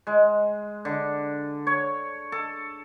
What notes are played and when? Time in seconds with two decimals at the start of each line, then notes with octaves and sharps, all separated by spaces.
0.07 G#3
0.85 D3
1.67 C#5
2.32 A4